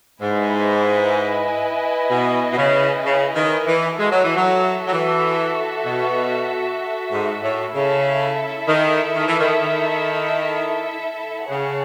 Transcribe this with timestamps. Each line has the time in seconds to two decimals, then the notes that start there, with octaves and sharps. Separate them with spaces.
0.21 G#2 E4 B4 D#5 G#5
2.10 B2
2.52 B2
2.57 C#3
3.04 C#3
3.35 D#3
3.67 E3
3.98 G#3 F#4 A4 E5
4.11 F#3
4.24 E3
4.37 F#3
4.87 F#3
4.92 E3
5.86 B2
7.11 G#2
7.43 A2
7.73 C#3 E4 A4 E5
8.68 D#3
9.15 D#3
9.27 E3
9.39 D#3
9.62 D#3
11.50 C#3 G#4 C#5 F#5 A5